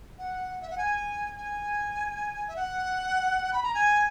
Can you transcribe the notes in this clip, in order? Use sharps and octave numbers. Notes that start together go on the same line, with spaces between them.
F#5
E5
F#5
G#5
G#5
E5
F#5
B5
A#5
G#5